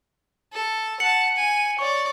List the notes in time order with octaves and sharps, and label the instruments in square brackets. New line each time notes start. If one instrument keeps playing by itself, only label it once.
[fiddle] A4
[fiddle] F#5 A5 [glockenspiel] C#7 F#7
[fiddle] G#5
[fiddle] C#5 D5 [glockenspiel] C#6